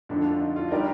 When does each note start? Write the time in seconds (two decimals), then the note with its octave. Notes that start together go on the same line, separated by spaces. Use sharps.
0.09 F2 D3 A3 D4
0.24 F4
0.41 D#4
0.56 F4
0.68 G3 D4 D#4 G4 A#4 D5